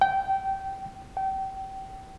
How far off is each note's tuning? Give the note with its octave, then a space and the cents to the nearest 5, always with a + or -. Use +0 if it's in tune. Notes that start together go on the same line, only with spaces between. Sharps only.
G5 -20
G5 -30